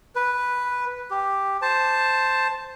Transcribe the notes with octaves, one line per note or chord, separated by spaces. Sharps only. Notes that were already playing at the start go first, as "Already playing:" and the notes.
B4
G4
C5 A5